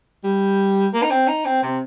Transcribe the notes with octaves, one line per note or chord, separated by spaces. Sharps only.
G3
A#3
D#4
C4
D#4
C4
C3